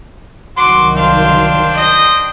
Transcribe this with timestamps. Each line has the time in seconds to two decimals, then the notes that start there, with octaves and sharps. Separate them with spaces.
0.57 C2 D#3 F#3 F#4 C6 D6
0.96 D4 C5 F5 G5 C6
1.73 D#5